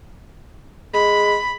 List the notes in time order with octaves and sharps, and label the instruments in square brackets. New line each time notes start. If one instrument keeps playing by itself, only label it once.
[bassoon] G#3 [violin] B5